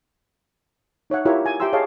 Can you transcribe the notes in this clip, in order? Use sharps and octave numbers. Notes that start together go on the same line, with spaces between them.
D#4 C#5 E5 F#5
E4 F4 G4 A#4 C#5 E5
G#5
G4 E5 G5 A#5 C6 E6
G#4 C#5 D#5 F5 A5